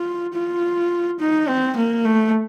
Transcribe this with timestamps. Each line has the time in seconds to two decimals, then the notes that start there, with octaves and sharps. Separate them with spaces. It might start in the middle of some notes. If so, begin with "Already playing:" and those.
Already playing: F4
0.34 F4
1.19 D#4
1.48 C4
1.76 A#3
2.05 A3